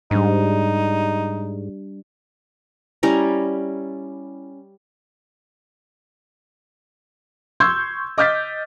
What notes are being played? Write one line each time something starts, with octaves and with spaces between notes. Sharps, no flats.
G#2 G3 D4 D#4
G3 C#4 E4 A#5
C6 C#6 E6 G6 G#6
D#5 D6 F6 G6 A6 B6